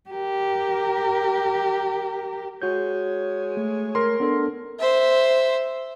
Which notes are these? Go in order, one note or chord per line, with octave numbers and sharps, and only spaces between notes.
G4 A#4
G#3 F#4 C#5 G6
A3
A#4 C6
B3 D4 A4
C5 E5